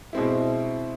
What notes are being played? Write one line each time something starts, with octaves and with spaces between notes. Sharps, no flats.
B2 G#3 C4 E4